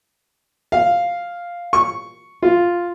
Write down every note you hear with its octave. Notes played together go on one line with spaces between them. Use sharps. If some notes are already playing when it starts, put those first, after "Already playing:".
F5
C#6
F4